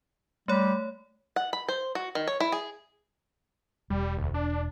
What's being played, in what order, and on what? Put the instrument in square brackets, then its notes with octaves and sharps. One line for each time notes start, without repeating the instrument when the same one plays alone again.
[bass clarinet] G3 [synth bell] A3 C#5
[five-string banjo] F#5
B5
C5
F#4
D#3
C#5
E4
G#4
[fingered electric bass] E1 [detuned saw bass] G3
[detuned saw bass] D2
D4